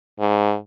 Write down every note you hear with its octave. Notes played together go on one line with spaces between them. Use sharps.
G#2